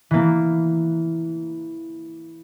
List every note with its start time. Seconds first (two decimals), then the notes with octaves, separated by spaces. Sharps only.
0.11 E3 A#3